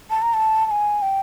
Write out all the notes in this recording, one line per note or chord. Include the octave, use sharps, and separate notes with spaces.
A5
A#5
A5
A5
G#5
G5